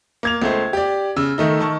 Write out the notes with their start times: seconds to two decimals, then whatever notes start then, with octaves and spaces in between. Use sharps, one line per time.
0.23 A#3 G#6 F7
0.42 C#2 A3 C5
0.73 G4 D5
1.16 C#3 E6
1.38 D#3 A3 D#4
1.60 D#3 A5 C#6